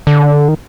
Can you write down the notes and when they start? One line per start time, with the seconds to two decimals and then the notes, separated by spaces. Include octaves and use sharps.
0.07 D3
0.48 D#3